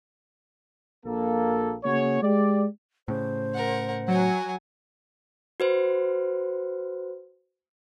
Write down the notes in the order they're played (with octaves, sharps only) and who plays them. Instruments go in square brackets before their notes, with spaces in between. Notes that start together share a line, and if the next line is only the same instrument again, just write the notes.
[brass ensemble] A#1 A#3 A4
C#3 A#3 F#4 G#4 C#5
G#3 G4 D5
[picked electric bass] A2 C#3 [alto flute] C5
[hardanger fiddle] A#4 F#5
[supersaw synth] F#3 [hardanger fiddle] F#5 G#5
[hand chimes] F#4 B4 C5